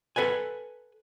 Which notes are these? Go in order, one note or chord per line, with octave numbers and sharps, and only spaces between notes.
A4 B4 F#5 G#5